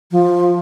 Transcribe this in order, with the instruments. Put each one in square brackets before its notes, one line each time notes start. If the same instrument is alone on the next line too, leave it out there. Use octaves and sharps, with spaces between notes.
[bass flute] F3